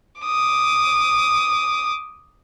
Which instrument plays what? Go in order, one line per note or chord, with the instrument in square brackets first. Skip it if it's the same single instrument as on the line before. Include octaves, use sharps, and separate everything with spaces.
[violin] D6 D#6